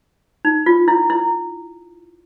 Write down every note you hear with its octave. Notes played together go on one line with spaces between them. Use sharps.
D#4
F4
E4
E4